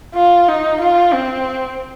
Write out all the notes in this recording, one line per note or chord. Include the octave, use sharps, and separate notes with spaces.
F4
D#4
F4
C4